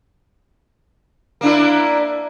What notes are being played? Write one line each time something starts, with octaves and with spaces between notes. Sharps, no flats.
A#3 D4 E4